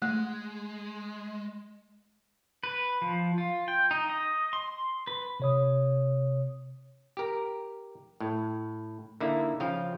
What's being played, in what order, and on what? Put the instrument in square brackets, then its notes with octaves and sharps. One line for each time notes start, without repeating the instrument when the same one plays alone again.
[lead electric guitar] G#3 [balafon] A3
[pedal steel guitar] B4
F3
F4
G5
D#4
D#5
C6
B4
[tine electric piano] C3 C#5 D#6
[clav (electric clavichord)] G4 A#4
A2
D3 A#3 D#4 E4
C#3 F3 F5 G5